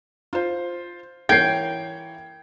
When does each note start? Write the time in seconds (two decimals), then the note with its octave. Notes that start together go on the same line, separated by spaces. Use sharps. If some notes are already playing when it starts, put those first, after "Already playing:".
0.33 F4 C5
1.29 E3 A#3 C#5 G5 G#6 C7